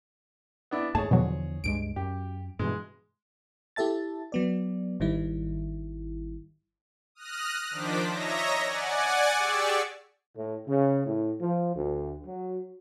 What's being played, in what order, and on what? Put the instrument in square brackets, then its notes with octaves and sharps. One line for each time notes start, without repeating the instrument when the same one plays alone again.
[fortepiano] B3 D4 E4
[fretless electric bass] D#2 G#2 A3 [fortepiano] G#4 C#5 [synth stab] A5
[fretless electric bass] E2 D3 F3 [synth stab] B2 F#3
[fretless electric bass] C#2 G2 G#3 [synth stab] D7
[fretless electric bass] F#2 [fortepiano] G4
[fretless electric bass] G2 B2 E3 [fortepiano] G#3
[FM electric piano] E4 G4 A4 E5 A5 A6
F#3 B3 D5
G#1 D#3 G3 E4
[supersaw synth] D#6 F6 F#6 A#6
D#3 F3 D4 C5 D6 B6
C#5 D#5 E5 A#5 A#6
D5 F#5 G#5
G4 G#4 D5 C#6 E6
[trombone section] A2
C#3
A2
F3
D2
F#3